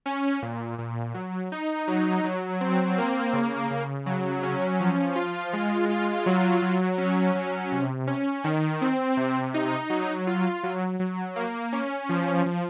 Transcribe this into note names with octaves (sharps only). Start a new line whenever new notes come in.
C#4
A#2
A#2
F#3
D#4
F#3
F#3
C4
A#3
C#3
C#3
F#3
C#4
F3
F4
G#3
F4
F#3
F#3
C#4
F#3
C3
C#4
D#3
C4
C3
D#4
F#3
F4
F#3
F#3
A#3
C#4
F3
F3